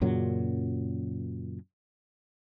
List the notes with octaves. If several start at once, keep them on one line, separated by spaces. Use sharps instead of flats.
F#2 A#2 C#3 F#3